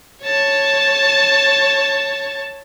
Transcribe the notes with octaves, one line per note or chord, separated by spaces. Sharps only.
C#5 A5